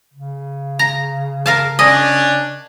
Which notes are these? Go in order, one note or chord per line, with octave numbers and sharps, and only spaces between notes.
C#3
A#5
A#4 F5 A5
C#4 D4 D#5